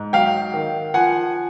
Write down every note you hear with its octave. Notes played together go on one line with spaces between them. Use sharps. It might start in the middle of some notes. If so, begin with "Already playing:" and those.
Already playing: G#2
F#3 F5 G5
D#3
F3 F#5 G#5